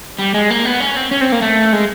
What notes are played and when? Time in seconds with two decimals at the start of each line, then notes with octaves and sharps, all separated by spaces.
0.19 G3
0.34 G#3
0.50 A#3
0.65 B3
0.80 C#4
0.96 C4
1.11 C#4
1.21 C4
1.32 A#3
1.42 A3
1.73 G#3